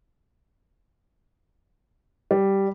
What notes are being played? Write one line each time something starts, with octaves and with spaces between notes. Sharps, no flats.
G3